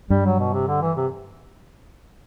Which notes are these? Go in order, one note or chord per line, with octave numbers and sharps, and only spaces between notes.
G2 G3
F#3
B2
C3
D3
E3
C3